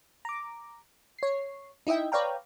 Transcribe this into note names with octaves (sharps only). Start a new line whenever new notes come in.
A#5 D6
C#5 C7
D#4 E4 D#5 E5 G5
B4 C#5 D5 F5 G5 A#5